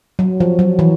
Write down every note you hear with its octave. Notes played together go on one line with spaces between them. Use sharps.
F#3
F3
F#3
E3